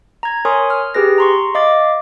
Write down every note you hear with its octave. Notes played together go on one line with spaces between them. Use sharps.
A#5 G#6
A#4 C#5 G#5 C6 C#6 D#6
F6
G4 G#4 B4 A#6
A#5 C6 C#6
D#5 F5 D6 A6